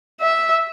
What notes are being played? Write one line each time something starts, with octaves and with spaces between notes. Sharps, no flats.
E5